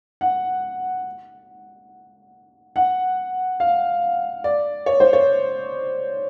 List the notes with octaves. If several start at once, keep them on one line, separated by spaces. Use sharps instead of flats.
F#5
F#5
F5
D5
C#5
C5
C#5